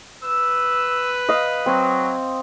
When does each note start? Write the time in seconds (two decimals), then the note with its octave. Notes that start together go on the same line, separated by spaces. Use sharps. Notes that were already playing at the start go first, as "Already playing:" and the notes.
0.23 B4 E6
1.29 D#5 F5
1.66 F#3 C4